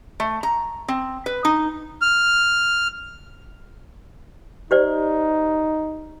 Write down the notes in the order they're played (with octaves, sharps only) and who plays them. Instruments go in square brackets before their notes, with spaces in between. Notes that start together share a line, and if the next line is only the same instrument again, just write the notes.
[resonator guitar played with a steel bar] A3
A#5
C4
B4
D#4
[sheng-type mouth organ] F6
[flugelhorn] D#4 [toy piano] G4 C5 D5